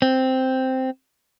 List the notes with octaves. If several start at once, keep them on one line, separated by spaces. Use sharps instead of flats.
C4